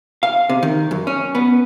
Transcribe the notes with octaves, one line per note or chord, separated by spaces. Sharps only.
F5
C3
D#3
F#2
C#4
B3